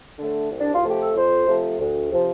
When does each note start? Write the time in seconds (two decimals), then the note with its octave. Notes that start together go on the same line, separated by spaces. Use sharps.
0.18 D3 A3
0.51 C2
0.59 D4
0.73 F4
0.83 C3 F3 A3 G4
1.01 A4
1.15 F2 C5
1.47 C3 F3 A3
1.79 D2
2.12 C3 F3